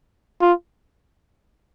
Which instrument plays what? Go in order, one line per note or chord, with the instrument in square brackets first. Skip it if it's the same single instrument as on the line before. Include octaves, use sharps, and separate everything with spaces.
[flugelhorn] F4